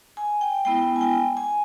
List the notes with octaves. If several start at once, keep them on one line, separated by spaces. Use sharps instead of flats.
G#5
G5
G#3 B3 E4 G5
G#5
G5
G#5